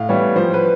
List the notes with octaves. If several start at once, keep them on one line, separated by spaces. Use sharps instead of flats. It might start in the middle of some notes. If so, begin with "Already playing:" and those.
Already playing: A2 F5
E3 G3 B3 C#5
F3 C5
B4